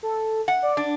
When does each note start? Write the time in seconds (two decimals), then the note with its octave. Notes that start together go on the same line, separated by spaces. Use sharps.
0.03 A4
0.48 F#5
0.62 D5
0.77 D4